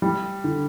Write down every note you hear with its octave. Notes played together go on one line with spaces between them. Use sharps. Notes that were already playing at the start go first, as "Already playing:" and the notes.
G3
D3